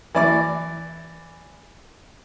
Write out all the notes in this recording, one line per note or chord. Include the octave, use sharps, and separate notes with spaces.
E3 D5 D6